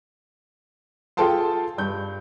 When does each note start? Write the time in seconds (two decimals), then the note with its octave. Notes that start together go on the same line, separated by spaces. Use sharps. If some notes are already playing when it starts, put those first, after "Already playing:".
1.17 F4 G#4 A4 G5 A5 C6
1.78 G2 G6